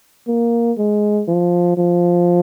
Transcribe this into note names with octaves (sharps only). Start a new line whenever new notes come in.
A#3
G#3
F3
F3